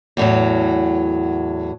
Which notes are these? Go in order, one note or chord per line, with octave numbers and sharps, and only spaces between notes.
E2 A2 F#3